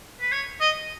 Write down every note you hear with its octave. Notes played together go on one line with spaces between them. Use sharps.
B4
C#5
D#5